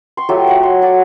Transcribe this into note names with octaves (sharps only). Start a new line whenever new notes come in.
C6 C#6
F#3 A3 F4 G4
C#5 F#5
C6
F#4 D5